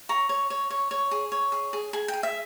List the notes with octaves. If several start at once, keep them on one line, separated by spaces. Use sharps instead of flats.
C#5 A#5
C#5
C#5
C#5
C#5
G#4
C#5
G#4
G#4
G#4 G#5
G5
G#4
E5